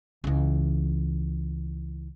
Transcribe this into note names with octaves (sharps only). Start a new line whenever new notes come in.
C#2 E3